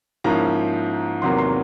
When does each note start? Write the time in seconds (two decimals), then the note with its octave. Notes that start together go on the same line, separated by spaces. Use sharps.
0.24 G#2 F3 A#3 C#4 E4 A#5
1.22 E2 C3 D#3 F#3 A#3 C6
1.38 C6